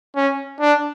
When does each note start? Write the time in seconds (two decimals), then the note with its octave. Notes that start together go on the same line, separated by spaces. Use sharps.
0.16 C#4
0.60 D4